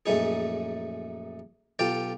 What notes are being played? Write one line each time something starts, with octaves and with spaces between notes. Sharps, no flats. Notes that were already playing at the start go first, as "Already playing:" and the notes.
A#1 F#2 A3 D#4 G#4
B1 F4 G4 A4 G5